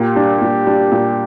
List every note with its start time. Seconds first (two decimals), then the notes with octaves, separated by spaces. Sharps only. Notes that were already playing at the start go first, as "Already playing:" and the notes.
Already playing: A#2 G4
0.15 G3 D4
0.41 A#2
0.66 G3 D4
0.91 A#2